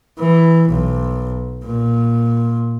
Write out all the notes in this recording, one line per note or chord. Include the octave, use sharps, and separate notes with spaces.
E3
B1
A#2